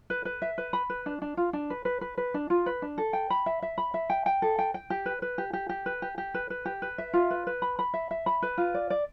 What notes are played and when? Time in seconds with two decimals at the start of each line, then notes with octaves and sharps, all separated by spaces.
0.10 B4
0.25 B4
0.42 E5
0.58 B4
0.73 B5
0.90 B4
1.06 D4
1.22 D4
1.37 F4
1.53 D4
1.70 B4
1.85 B4
2.01 B4
2.18 B4
2.34 D4
2.50 F4
2.66 B4
2.82 D4
2.98 A4
3.13 G5
3.30 B5
3.46 E5
3.62 E5
3.78 B5
3.94 E5
4.10 G5
4.26 G5
4.42 A4
4.59 G5
4.74 G5
4.90 G4
5.06 B4
5.22 B4
5.38 G4
5.53 G4
5.69 G4
5.86 B4
6.02 G4
6.18 G4
6.34 B4
6.50 B4
6.65 G4
6.82 B4
6.98 E5
7.13 F4
7.30 B4
7.47 B4
7.62 B5
7.79 B5
7.94 E5
8.11 E5
8.26 B5
8.42 B4
8.58 F4
8.74 D5
8.90 D5